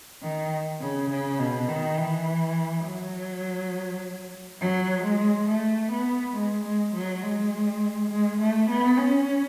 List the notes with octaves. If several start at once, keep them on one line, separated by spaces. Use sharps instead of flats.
D#3
C#3
C#3
B2
D#3
E3
F#3
F#3
G#3
A3
B3
G#3
G#3
F#3
G#3
G#3
A3
B3
C#4